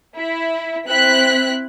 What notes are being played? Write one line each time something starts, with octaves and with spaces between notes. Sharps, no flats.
E4
C4 E4 F#6 B6